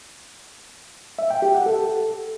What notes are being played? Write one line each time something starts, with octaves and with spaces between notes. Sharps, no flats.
E5
G5
G4
F#5
A4